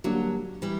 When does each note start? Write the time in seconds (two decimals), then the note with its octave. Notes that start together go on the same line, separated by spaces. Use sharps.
0.04 D3 F#3 G3 A#3 D4 G4
0.62 E3 G3